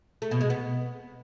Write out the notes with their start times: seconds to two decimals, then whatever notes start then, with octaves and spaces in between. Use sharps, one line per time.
0.22 A3
0.31 B2
0.41 G#3
0.50 B3